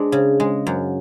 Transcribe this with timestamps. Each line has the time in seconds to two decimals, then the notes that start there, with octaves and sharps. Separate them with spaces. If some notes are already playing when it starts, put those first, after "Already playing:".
Already playing: G#3 D4
0.12 C#3
0.40 G#3
0.67 F#2